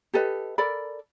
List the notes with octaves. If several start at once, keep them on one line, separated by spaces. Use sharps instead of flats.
G4 A4 B4 D#5
A4 A#4 D5 B5